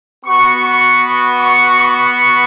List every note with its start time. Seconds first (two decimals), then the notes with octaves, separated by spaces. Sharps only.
0.25 B3 F#4 C#6
0.64 C#6
1.40 C#6
1.79 C#6